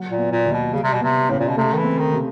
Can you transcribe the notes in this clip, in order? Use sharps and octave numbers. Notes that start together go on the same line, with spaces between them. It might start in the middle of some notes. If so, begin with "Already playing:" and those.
Already playing: F#3
A#2
B3
A#2
D#2
B2
C#3 G3
C3
B2
C3 B3
A2 C#3
A#2
B2
C3 A3
D#3
E3
C4
D#3
C3